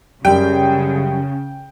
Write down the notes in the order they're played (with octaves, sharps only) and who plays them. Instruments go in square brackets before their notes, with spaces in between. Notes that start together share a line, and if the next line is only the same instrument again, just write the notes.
[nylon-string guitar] F#2 G3 [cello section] C#3 [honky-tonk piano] G5